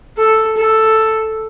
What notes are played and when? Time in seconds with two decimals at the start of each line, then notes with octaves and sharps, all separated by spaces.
0.18 A4
0.57 A4